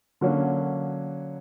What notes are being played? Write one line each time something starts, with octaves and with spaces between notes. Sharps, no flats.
D3 F#3 A#3 C#4